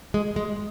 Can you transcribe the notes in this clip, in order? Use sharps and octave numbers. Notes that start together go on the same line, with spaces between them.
G#3
G#3